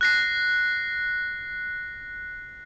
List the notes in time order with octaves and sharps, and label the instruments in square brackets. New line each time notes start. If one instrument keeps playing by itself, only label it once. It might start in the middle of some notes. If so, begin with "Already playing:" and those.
[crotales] F#6 A#6 C7